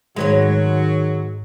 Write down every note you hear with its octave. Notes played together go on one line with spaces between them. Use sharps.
G#2 D#3 F#3 G#3 B4 C#5